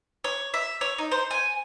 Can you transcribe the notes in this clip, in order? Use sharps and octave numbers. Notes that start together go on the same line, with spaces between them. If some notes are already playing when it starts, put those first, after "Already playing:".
C#5
E5
C#5
D#4
C5
G#5